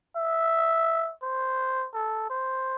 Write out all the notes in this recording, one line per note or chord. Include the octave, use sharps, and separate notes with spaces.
E5
C5
A4
C5